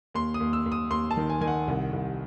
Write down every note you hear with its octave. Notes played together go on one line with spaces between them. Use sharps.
D#2 C6
D#6
D#2
E6
D#2
D#6
D#2 C6
A5
D#3
G#5
D#3 G#5
F#5
C2
C2